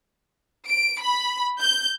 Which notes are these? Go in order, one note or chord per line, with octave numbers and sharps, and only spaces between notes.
D7
B5
G6